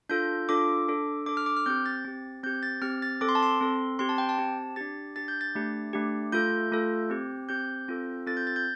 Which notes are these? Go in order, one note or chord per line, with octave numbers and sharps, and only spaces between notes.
D4 F4 A4 G6
D4 F4 A4 D6
D4 A4
D4 A4 D6
F6
D6
F6
C4 G4 G6
A6
C4 G4
C4 G4 G6
A6
C4 G4 F6
A6
C4 A4 D6
C6
A5
C6
C4 A4
C4 G4 C6
A5
G5
A5
C4 G4
D4 G4 A6
D4 G4 A6
G6
A6
A3 D4 G4
A3 D4 G4
A3 F4 A4 G6
A3 F4 A4
C4 G4
C4 G4 G6
C4 F4 A4
C4 F4 A4 A6
G6
A6
G6